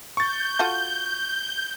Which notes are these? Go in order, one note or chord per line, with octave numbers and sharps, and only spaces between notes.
C#6 G6 A6
F4 F#4 A4